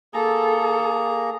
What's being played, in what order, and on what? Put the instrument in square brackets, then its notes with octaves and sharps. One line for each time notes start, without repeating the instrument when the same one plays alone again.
[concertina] A#3 G#4 A#5 [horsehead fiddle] A4